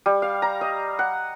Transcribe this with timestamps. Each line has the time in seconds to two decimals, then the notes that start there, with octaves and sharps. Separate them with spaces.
0.06 G3
0.22 F5
0.42 A#5
0.61 D#5
0.99 F#5